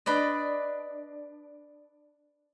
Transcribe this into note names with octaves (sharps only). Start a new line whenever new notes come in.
D4 B4 D5 D#5